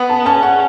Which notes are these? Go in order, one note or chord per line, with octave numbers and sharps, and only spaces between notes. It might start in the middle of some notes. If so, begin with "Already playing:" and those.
Already playing: B3
A5
C#4 A5
F#5